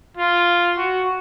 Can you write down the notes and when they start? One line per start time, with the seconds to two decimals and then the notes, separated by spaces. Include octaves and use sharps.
0.17 F4
0.77 F#4